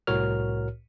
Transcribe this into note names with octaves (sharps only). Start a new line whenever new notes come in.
C2 A2 F#4 A#4 C#5 F6